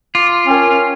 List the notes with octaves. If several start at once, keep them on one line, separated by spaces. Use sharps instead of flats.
F4 D6
C#4 A#4 G5 A5